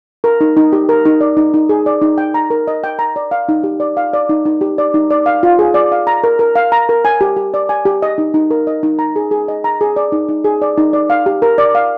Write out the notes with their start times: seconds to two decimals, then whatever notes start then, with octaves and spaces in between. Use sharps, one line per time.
0.24 A#4
0.41 D#4
0.57 D#4
0.73 G4
0.89 A#4
1.05 D#4
1.21 D5
1.37 D#4
1.54 D#4
1.69 G#4
1.86 D5
2.02 D#4
2.18 G5
2.34 A#5
2.50 A#4
2.68 D#5
2.84 G5
2.99 A#5
3.16 D5
3.31 F5
3.49 D#4
3.64 G4
3.80 D5
3.97 F5
4.13 D5
4.29 D#4
4.45 D#4
4.61 G4
4.78 D5
4.94 D#4
5.10 D5
5.26 F5
5.43 F4
5.59 G#4
5.74 D5
5.92 F5
6.07 A#5
6.24 A#4
6.39 A#4
6.56 F5
6.72 A#5
6.89 A#4
7.05 G#5
7.21 G4
7.36 G4
7.54 D5
7.69 G#5
7.85 G4
8.02 D#5
8.18 D#4
8.34 D#4
8.51 A#4
8.67 D#5
8.83 D#4
8.99 A#5
9.16 G#4
9.31 G#4
9.48 D#5
9.64 A#5
9.81 G#4
9.96 D5
10.12 D#4
10.29 D#4
10.44 G#4
10.62 D5
10.78 D#4
10.93 D5
11.10 F5
11.26 G4
11.42 A#4
11.58 D5
11.75 F5